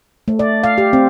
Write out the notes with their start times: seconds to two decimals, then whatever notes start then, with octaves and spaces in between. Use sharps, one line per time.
0.28 A3
0.39 D5
0.64 F5
0.78 G4
0.93 C4